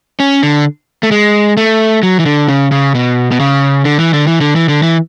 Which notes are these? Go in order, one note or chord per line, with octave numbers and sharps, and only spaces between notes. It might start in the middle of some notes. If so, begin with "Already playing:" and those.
C#4
D3
A3
G#3
A3
F#3
E3
D3
C#3
C#3
B2
B2
C#3
D3
E3
D3
E3
D3
E3
D3
E3